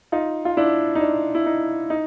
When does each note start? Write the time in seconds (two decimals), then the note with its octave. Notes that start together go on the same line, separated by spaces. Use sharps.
0.12 D#4 F4
0.45 F4
0.57 D4 E4
0.95 D#4
1.01 D4
1.35 E4
1.46 D#4
1.90 D#4